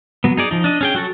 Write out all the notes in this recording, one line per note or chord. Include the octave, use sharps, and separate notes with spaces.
F#3 B3
D#4 G#4 D5
F3 D#4
D4 D#5
C#4 G#4 G5
F#3 F#4 A4